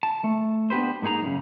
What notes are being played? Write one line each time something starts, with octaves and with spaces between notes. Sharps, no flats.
A5
A3
B3 D4 G4 B4 C5
G#2 A#3 D#4 G#4 A#5
F#2 A2 C#3